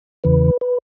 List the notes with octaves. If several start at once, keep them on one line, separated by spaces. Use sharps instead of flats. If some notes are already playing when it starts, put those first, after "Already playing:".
E2 C#3 E3 B4
B4